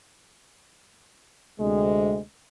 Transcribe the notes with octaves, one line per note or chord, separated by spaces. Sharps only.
D2 C3 G#3